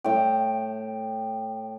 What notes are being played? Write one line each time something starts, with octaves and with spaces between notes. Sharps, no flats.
A2 G5